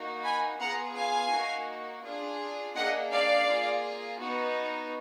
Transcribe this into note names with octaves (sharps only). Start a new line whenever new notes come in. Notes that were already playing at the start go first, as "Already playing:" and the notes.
Already playing: A#3 D#4 F#4
G#5 B5
B3 F4 G#4 F#5 A#5
F5 G#5
A#3 D#4 F#4
D4 F4 G#4
A#3 D4 G#4 D#5 F#5
D5 F5
A#3 F4 G#4
B3 D#4 F#4